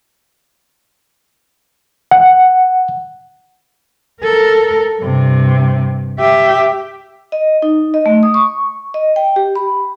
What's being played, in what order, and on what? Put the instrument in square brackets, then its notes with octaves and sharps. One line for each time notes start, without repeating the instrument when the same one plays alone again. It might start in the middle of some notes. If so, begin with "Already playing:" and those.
[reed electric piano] F#5
[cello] A4 A#4
G2 C3
G4 E5
[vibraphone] D#5
D#4
D#5
A3
D#6
C#6
D#5
G5
G4
B5